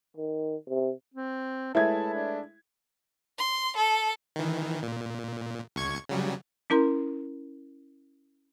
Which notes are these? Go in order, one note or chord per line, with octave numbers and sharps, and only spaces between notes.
D#3
C3
C4
G#3 A3 E4 B4 C#5 E5 A5 G#6
D4
C6
A4
D#3 E3
A#2
C#2 C#6 G#6
C#3 F#3 G3
C#4 E4 A#4 A#5 C6